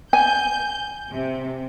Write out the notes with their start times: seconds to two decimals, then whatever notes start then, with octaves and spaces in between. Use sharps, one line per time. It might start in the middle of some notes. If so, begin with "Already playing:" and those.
0.13 G#5 G6
1.10 C3